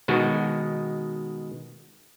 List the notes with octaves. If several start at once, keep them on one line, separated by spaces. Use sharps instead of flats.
B2 D#3 G#3 F#4